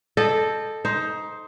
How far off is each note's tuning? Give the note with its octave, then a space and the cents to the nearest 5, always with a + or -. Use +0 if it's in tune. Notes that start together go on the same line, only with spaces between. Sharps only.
A4 -5 D#5 -25 G5 +5
D#4 +15 C5 +0